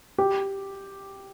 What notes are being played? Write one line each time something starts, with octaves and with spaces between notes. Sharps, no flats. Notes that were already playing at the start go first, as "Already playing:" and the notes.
G4